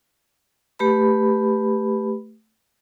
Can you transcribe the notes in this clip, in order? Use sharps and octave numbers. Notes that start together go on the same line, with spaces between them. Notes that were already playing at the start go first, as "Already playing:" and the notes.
A3 G4 B4 B5